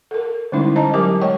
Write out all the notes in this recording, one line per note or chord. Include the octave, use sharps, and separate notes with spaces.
A4 A#4
D3 G3 G#3 C#4 D#4 E4
C5 D#5 A5 A#5
F#3 G4 A#4 G#5 D6
G#3 C#5 D#5 G5 C#6